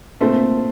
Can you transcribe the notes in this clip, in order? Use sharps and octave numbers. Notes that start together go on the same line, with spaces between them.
A#2 A3 C4